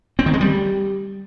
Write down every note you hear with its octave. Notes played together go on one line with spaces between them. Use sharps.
C4
D#3
G#3
G3